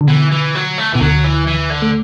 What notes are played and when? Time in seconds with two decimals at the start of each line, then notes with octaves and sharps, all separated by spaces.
0.01 D3
0.08 B2 E3
0.31 E3
0.55 F#3
0.78 A3
0.93 B2 E3
1.01 D2 D3 F#3
1.24 E3
1.47 E3
1.70 D3
1.82 A3